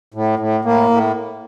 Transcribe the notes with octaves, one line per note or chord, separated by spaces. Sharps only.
A2
A2
A2 A#3
A2